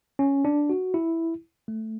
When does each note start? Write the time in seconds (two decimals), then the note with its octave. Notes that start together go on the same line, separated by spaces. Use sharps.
0.19 C#4
0.45 D4
0.70 F#4
0.94 E4
1.68 A3